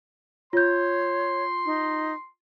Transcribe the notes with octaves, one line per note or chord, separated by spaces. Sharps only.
F4 C#5 C6 G6
D#4